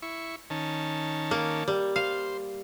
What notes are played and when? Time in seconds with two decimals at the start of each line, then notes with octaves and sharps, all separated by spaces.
0.02 E4 C#6
0.50 D#3 C#4 A5
1.31 A#3
1.68 G3
1.96 C5 F5